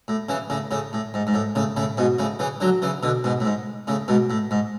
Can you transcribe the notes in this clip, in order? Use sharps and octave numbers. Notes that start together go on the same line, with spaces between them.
A2
C#3 E3
A2 C#3
A2 C#3
A2
G#2
G#2
A2
A2 C#3
A2 C#3
G#2 B2
A2 C#3
C#3 E3
D3 F#3
C#3 E3
B2 D3
G#2 B2
A2
G#2
A2 C#3
G#2 B2
A2
G#2